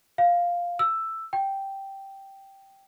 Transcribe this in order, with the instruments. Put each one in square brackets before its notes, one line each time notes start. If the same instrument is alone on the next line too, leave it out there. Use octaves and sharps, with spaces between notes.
[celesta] F5
E6
G5